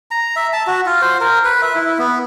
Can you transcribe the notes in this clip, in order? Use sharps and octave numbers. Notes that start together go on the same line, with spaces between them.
A#5
E5
A5
F#4
F4
C5
A#4
B4
E5
E4
B3